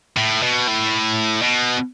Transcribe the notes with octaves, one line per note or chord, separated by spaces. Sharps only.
A2
B2
A2
B2